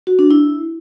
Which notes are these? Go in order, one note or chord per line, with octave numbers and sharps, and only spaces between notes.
F#4
D4
E4